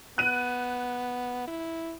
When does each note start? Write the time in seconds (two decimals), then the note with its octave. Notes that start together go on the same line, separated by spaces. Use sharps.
0.18 B3 F#6 D#7
1.47 E4